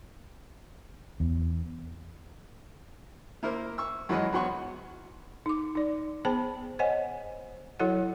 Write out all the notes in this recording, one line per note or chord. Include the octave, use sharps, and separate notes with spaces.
E2
A#3 E4 A#4 C5
C#6 E6
F#2 E3 F#3 G#3 F#4 D#5
G#2 F#3 B3 F#5 C6 C#6
D#4 D6
D#4 D5
B3 G#4 C5 G5 A5 B5
C5 C#5 D#5 F#5 G#5
F#3 E4 F#4 A4 C#5 F#5